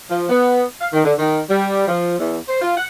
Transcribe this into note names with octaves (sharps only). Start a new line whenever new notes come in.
F3
B3
F5
D#3
D3
D#3
G3
F3
E2
C5
F4
F#5